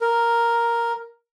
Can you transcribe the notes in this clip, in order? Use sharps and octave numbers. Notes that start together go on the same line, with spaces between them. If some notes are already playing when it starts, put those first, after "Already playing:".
A#4